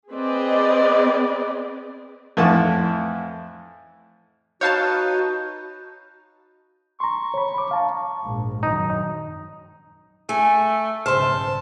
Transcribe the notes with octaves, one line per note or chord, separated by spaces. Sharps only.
C4 G#4 B4 D5 D#5
F2 A2 E3 F#5 A5
D#4 F#4 B4 C#5 F5 A5 G6
A#5 C6 C#6
C#5 B5
B5 D6
F5 A5 A#5
A#1 G#2
F#2 D#3 D#4
A3 G#5
B1 G#2 C#3 C5 E5 A5 C6 F6